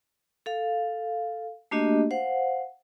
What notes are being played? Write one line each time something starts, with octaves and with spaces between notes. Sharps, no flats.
A4 F5
A3 A#3 D4 F#4 G4 D#5
C5 F5 F#5